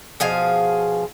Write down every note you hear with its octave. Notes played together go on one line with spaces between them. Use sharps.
B2 F3 G#4 F5